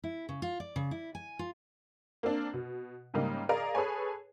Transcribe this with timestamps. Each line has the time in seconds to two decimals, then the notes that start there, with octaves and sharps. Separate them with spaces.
0.04 E4
0.29 C#3
0.42 F4
0.60 D5
0.76 C#3
0.91 E4
1.15 G#5
1.39 F4
2.23 A#3 C4 D4
2.53 B2
3.14 G#2 C#3 G3 A#3 D#4
3.49 G#4 A#4 D5 D#5 F5
3.75 G#4 A4 B4 C#5 G#5